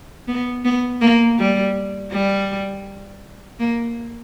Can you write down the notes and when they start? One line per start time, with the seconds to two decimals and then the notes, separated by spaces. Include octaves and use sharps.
0.28 B3
0.65 B3
1.01 A#3
1.39 G3
2.12 G3
3.59 A#3